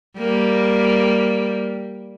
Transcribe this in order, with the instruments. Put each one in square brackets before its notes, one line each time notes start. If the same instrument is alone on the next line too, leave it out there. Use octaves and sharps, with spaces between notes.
[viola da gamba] G3 A#3